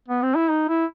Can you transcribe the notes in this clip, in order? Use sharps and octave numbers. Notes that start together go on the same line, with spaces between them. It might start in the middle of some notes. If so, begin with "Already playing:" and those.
B3
C4
E4
D#4
E4